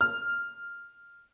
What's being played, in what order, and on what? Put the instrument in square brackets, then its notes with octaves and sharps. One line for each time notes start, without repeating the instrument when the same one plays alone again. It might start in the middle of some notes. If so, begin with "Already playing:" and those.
[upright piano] F6